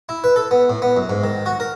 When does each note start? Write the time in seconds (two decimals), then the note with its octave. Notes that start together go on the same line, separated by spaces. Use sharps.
0.09 E4
0.24 B4
0.36 A4
0.51 B3
0.70 A2
0.82 B3
0.97 F#2
1.10 G#2
1.24 D#3
1.46 F#4
1.60 A#4